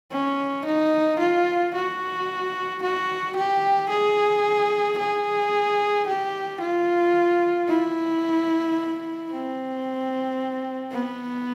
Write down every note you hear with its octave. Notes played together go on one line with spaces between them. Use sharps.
C#4
D#4
F4
F#4
F#4
G4
G#4
G#4
G4
F4
E4
C4
B3